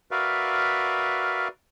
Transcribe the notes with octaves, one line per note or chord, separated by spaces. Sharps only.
F#4 A#4 B4 D5 E5 F5